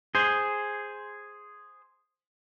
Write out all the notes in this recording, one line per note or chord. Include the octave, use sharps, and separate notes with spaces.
G#4 C5